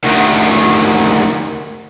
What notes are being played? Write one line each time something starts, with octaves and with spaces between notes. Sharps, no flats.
D2 D#3